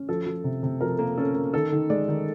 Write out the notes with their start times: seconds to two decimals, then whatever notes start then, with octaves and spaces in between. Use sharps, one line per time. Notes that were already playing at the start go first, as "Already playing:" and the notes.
Already playing: C#4
0.09 F3 A4
0.26 F3
0.44 C3
0.63 C3
0.81 F3 A#4
0.99 A#3
1.18 C#4 A4
1.35 A#3
1.54 D#3 A4
1.72 D#3
1.90 G#3 D5
2.08 D#3